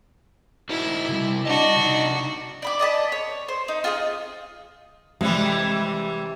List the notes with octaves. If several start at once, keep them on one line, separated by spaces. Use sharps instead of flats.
E4 F#4 A#4 C5
C3 F3 G3
D4 F#4 D#5
C3 D#4
D5 B5 D6
D5 D#5 A5 B5
C#5
C5
D#4
F4 G#4 D#5
C3 E3 G3 G#3